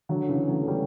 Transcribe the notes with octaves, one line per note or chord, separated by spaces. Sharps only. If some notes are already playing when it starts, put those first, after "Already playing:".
D3 F#3
C#3 E3
F#3 A3
A3
G3 B3